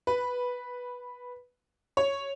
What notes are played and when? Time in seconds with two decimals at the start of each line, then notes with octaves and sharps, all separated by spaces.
0.07 B4
1.97 C#5